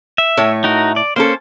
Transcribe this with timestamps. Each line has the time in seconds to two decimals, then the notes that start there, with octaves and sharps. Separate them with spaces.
0.18 E5
0.37 A2 A3 C#5
0.64 D#4 F#4 A#4
0.96 D5
1.16 A#3 C#4 A4 C5